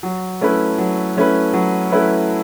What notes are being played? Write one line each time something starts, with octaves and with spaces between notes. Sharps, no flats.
F#3
A3 C#4 E4 B4
F#3
A3 C#4 E4 B4
F#3
A3 C#4 E4 B4